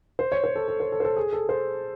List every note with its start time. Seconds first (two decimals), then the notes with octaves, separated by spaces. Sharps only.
0.19 C5
0.32 C#5
0.44 C5
0.55 A4
0.68 A4
0.80 C5
0.92 A4
1.00 C5
1.04 A4
1.16 G#4
1.33 A4
1.49 C5